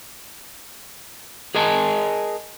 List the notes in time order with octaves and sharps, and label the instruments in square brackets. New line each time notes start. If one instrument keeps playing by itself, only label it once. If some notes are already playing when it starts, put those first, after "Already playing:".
[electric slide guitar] G#4 A#4 D#5 G#5 A5